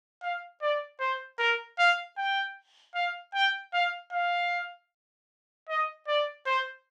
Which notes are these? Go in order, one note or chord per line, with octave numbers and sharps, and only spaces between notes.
F5
D5
C5
A#4
F5
G5
F5
G5
F5
F5
D#5
D5
C5